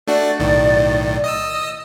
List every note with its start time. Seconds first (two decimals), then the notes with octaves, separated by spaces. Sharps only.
0.07 A3 D4 F#4 D5
0.39 B1 A2 D#3
1.24 D#5 D#6 E6